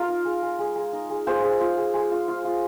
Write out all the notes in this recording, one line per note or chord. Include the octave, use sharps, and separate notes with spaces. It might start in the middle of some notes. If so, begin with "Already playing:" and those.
Already playing: F4 A#4
D#4
G#3
G#3
G#3
G#3
D#4
G#3
F4 G#4 C5
G#3
F4
G#3
G#3
F4
F4
F4